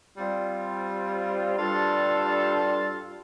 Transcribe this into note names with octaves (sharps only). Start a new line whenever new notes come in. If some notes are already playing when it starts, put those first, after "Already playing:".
G3 C4 F4
G2 G3 D4 F4 A4